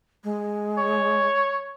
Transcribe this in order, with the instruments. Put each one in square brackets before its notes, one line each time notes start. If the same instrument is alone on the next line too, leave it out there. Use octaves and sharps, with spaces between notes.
[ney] G#3
[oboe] C#5